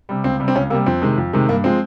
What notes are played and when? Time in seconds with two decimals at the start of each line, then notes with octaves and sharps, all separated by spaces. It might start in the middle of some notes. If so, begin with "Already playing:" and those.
0.09 C3 G3
0.24 C#2 C4
0.40 C3 G3
0.48 C4
0.55 C#2 C#4
0.70 C3 A#3
0.74 G3
0.86 F2 C4
1.02 C3 D#3 G#3
1.18 F2
1.33 C3 D#3 G#3
1.49 G2 A#3
1.64 F3 G#3 C4